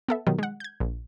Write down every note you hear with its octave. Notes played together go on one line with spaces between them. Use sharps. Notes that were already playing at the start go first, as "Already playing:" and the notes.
B3 A4 E5
B2 D#3 F#3 G3
G#3 F#5
G6 G#6
A#1